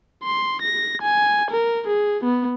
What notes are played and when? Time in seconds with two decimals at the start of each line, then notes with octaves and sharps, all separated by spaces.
0.24 C6
0.62 A#6
1.02 G#5
1.51 A#4
1.87 G#4
2.24 B3